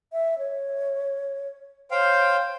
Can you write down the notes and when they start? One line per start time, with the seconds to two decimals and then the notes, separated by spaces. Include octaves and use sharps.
0.13 E5
0.39 C#5
1.91 C5 C#5 F5 G5